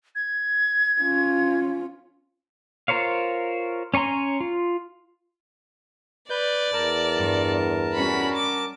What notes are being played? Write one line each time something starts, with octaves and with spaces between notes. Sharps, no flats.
G#6
C#4 F4
F4 A#4 C5 C#5 F5
C#4 C#5 G#5 A#5 C6
F4
B4 D5 G6
E2 A#4 A5
G2
G3 C#4 F#4 B5
D6